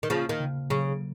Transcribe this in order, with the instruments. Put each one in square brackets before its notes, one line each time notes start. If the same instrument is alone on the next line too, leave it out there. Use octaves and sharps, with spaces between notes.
[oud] D#3
[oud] C#3 F3 [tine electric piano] A#3
[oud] D#3
[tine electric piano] C#3
[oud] C#3 [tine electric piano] F#3